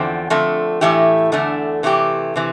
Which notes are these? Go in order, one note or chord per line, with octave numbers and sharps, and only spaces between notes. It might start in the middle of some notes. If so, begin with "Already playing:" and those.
Already playing: E2 D3 F3 C4
D3 F3 A3 C4
A2 E3 A3 E4 G4
E2 D3 A3
C3 E3 A3 D4 G4
C3 E3